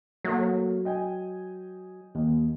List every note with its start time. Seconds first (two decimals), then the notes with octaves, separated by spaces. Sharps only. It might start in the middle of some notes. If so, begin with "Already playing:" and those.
0.24 F#3 A3 A#3
0.85 D#5 G5 G#5
2.15 D#2